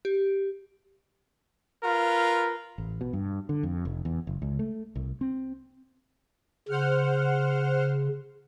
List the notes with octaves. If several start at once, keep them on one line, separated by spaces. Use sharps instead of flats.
G4
F4 A#4 B4
A1
B2
G2
D3
F2
F1
E2
F#1
C#2
A3
C2
C4
C#3 C5 F#5 F6